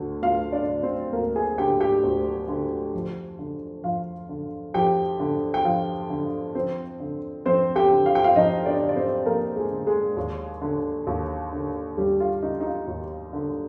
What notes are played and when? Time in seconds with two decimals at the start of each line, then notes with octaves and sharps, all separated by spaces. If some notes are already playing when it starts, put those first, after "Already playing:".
Already playing: D2 D3
0.22 D2 F4 F5
0.53 D4 D5
0.68 D3
0.83 C4 C5
1.13 D2 A#3 A#4
1.36 G#4 G#5
1.58 D3 G4 G5
1.81 G4 G5
2.04 D2
2.48 D3
2.94 F2
3.39 D3
3.84 F2 F4 F5
4.29 D3
4.74 F2 G4 G5
5.20 D3
5.54 G5
5.65 F2 F4 F5
6.10 D3
6.55 F2 C4 C5
7.00 D3
7.46 F2 C4 C5
7.76 G4 G5
7.91 D3
8.06 F5
8.15 G5
8.24 F4 F5
8.36 F2 D#4 D#5
8.66 D4 D5
8.81 D3
8.89 D5
8.96 C4 C5
9.26 F2 A#3 A#4
9.56 G#3 G#4
9.72 D3
9.87 G#3 G#4
10.17 D#2
10.62 D3
11.07 D#2
11.52 D3
11.97 D#2 G3 G4
12.20 F4
12.43 D3 D#4
12.60 D#4
12.65 F4
12.87 D#2
13.33 D3